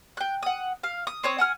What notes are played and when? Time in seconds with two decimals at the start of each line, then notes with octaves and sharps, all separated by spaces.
0.17 G5 F#6
0.43 F#5 D#6
0.84 F5
1.07 D#6
1.23 C4 C#5 D#6
1.38 F#5 G#5 F6